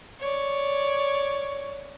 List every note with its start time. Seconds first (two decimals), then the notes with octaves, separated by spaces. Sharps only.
0.19 C#5 D5